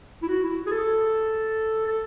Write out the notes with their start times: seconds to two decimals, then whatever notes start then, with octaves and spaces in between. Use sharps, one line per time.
0.22 E4
0.28 F#4
0.43 E4
0.67 G#4
0.71 A4
1.86 A4